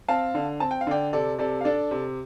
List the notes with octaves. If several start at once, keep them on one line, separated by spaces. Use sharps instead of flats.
C4 F5 A5
D3
C4 A5
G5
F5
D3 D5 G5
C3 A4 D5
C3 A4 D5
F5
D4 A4 D5
C3